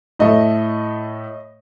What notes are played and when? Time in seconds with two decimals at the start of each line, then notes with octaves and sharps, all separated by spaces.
0.19 A2 A3 D#5